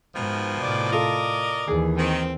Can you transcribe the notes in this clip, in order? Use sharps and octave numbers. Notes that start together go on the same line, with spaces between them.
G#2 B2 D#3 F3
A2 C3 D5
F4 A4 A#4 D#5
D#2 E3 G#4
D#3 C4